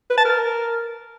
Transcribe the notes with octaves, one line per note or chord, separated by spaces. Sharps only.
B4
A5
A#4